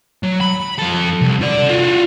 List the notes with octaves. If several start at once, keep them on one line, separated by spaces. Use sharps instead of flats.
F#3
B5
F2 A4
C2
A4 D5
F4 F#4